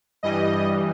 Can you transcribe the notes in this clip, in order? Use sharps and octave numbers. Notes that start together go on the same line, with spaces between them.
G2 E3 G3 D#5